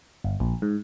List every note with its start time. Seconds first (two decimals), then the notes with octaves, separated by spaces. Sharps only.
0.24 G1
0.40 A#1
0.62 G#2